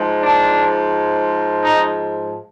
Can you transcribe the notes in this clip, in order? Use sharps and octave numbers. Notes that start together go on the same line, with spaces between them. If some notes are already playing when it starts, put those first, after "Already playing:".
Already playing: G#2 F3 G#3
D4
D#4